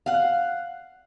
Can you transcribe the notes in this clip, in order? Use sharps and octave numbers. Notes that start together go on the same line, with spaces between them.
F5 F#5